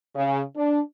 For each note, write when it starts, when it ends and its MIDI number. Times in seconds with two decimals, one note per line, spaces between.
0.16 0.42 49
0.56 0.81 62